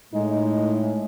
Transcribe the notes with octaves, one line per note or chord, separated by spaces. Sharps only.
A2 G#3 D#4